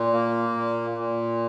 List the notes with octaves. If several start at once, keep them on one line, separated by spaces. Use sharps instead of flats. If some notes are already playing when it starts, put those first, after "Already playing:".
Already playing: A#2
A#3
A#2
A#2